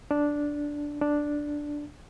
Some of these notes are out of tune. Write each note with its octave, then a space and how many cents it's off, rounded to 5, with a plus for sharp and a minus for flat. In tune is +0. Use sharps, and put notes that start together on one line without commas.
D4 -5
D4 +0